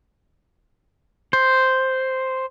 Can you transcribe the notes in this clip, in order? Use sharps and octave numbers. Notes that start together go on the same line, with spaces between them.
C5